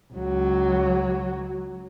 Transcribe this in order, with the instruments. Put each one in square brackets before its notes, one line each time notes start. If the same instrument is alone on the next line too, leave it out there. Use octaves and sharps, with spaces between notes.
[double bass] C#2 F#3